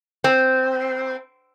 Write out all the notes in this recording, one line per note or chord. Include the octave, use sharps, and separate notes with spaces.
C4